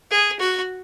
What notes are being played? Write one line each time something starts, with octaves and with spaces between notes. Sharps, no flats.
G#4
F#4